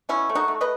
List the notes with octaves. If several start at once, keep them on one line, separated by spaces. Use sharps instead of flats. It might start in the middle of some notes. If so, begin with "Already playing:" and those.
B2 C#4 E4
A3
D#4 F#4
A3
B4 D#5